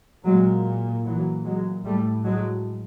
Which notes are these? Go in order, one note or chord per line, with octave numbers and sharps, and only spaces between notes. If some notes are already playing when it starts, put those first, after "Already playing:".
A#2 F#3 G#3
A#2 E3 F#3
F#3 G#3
A2 G3 A3
F#3 G#3